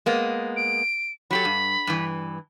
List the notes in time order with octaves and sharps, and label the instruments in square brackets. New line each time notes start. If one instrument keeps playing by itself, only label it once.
[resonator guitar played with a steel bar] G#3 A#3 B3
[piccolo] D7
[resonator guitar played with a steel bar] F#3 G4 A4 [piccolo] B5
[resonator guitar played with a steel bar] G2
G2 E3